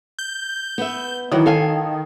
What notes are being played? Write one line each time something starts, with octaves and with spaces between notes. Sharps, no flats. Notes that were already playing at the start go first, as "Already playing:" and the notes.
G6
B3 E5
D#3 E3 F#3
A4 F5 G#5